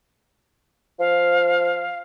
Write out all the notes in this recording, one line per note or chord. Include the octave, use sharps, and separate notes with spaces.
F3 F5